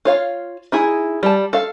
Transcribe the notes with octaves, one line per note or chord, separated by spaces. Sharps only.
F4 C#5 F5
D#4 E4 G#4
G3 A5
A4 F5